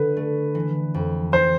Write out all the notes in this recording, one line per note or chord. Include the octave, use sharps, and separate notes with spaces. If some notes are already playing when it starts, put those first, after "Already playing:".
Already playing: D3 B4
A3
E3
F2
E3 C5